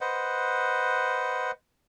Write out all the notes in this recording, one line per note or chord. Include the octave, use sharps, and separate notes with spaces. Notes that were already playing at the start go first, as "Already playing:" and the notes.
B4 C5 D#5 F#5